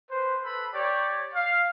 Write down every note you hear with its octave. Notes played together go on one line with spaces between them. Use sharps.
B4 C5
A4 B4 B5
G4 C#5 D5
F5